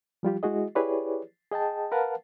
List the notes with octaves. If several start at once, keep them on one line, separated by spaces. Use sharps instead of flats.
F3 G3 F4 G4
G#3 E4 F#4 G#4 D#5
E4 G4 G#4 B4 C#5 D5
G#4 D#5 G5 A5
A#4 B4 F5 F#5 A5